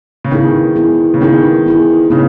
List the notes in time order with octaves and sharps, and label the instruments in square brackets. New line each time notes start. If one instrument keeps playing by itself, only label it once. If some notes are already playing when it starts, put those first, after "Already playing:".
[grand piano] C#3
[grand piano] D#3 [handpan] B3 E4 G#4
[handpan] B3 E4 G#4
[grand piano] C#3
[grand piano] D#3 [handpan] B3 E4 G#4
[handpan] B3 E4 G#4
[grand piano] C#3 [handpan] B3 D#4